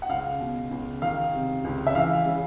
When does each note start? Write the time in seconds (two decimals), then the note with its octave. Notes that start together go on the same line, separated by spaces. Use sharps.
0.02 F#5
0.09 C#2 F5
0.40 B2
0.71 C#2
1.02 D#3 F5
1.33 C3
1.64 C#2
1.87 E5
1.95 E3 F5
2.26 C#3